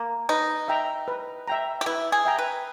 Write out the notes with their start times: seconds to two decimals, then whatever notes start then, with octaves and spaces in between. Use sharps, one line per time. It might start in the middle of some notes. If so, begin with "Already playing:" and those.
Already playing: A#3
0.29 D#4 B4
0.68 E5 G5 A#5
1.08 B4
1.48 E5 G5 A#5
1.81 G4
1.86 E4 B4
2.12 G#4
2.25 E5 G5 A#5
2.38 B4